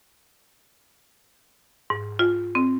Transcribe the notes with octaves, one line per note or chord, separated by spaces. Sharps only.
G#2
F4
C4